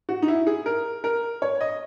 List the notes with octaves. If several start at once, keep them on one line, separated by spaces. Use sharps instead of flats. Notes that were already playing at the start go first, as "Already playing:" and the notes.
F#4
D#4
E4
G#4
A#4
A#4
C#5
D#5